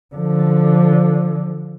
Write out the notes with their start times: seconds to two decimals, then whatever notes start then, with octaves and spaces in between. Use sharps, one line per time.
0.15 D3 F3